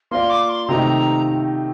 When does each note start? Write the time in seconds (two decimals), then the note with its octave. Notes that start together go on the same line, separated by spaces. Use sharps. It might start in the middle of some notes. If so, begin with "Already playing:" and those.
0.11 A#3 F4 A#4 D5 F5 C6
0.30 D6
0.49 C6
0.68 C3 D#3 A3 C4 D#4 A#5